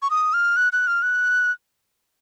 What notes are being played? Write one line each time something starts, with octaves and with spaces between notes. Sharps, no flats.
C#6
D#6
F6
F#6
F#6
F6
F#6